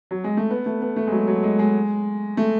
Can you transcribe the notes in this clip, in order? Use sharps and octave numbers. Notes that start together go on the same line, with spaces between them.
F#3
G#3
A3
B3
A3
B3
A3
G#3
F#3
F#3
G#3
G#3
A3